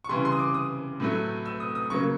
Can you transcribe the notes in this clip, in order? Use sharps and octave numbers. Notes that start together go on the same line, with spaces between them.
C#6
C#3 E3 G3 C6
C6
D#6
D6
D#6
A2 F#3 A3
E6
D#6
D#6
C#3 F#3 A#3 C#6